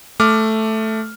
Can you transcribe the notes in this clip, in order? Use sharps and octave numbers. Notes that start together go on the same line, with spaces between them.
A3 D6 F6